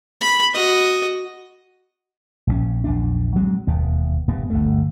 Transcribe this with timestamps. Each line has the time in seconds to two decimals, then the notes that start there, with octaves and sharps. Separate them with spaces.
0.21 B5
0.53 F#4 D#5
2.47 A#1 F#3 C#4
2.84 A#1 E2 D4
3.35 F#3 G#3 C4
3.67 E1 D#2 B3
4.28 D#1 G2 B3
4.50 G1 D2 A3